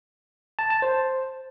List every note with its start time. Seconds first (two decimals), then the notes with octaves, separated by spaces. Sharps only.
0.59 A5
0.70 A5
0.82 C5